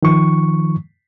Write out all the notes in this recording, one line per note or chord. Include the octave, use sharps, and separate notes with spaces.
D#3 F3 C#6